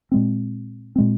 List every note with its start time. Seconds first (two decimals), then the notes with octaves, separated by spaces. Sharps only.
0.12 A#2 G#3 C4
0.96 A#2 G#3 C4